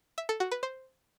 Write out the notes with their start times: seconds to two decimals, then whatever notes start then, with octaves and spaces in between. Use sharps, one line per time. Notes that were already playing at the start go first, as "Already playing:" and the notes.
0.18 E5
0.29 A4
0.40 F#4
0.52 B4
0.63 C5